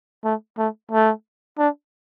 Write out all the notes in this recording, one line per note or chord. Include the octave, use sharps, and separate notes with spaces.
A3
A3
A3
D4